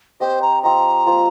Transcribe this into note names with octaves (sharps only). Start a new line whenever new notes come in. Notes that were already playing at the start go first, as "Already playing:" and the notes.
C4 G4 C5 D#5
A#5
F3 C4 G4 D#5 A#5
F3 A#3 F4 C5